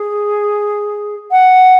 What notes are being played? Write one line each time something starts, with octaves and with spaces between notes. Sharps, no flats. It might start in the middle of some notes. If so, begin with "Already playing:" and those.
Already playing: G#4
F#5